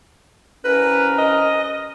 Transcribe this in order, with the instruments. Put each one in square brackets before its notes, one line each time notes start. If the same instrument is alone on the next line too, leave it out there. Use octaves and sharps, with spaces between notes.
[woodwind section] C2 C#4 A#4 [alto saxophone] B4
[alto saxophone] D#5